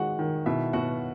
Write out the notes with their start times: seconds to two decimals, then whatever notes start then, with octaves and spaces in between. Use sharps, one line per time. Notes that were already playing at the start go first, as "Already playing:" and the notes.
Already playing: D#3 G#3 F#4 F#5
0.19 D#3
0.46 B2 E4 E5
0.73 B2 F#4 F#5